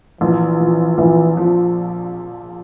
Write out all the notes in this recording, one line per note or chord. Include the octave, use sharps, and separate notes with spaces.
A#1 E3
A#2 F3
A#1 E3
F3